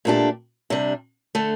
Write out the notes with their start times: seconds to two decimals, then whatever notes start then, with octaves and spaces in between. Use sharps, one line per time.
0.05 A#2 A3 D4 G4
0.70 C3 G3 D4
1.35 D3 A3